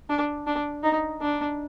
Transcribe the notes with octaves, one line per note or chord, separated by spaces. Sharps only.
D4
D4
D#4
D4